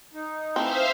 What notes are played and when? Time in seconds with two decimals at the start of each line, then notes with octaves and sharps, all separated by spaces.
0.14 D#4
0.56 E3 A3 C4 C5 E5 F5